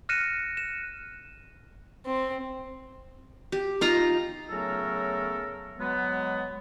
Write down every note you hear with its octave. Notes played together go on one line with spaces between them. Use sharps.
F6 F#6 A#6 C#7 D#7 E7
E7
C4
G4
D#4 F4 A#5
C#3 F#3 A3 B3 A4 A#4
F#3 G#3 B3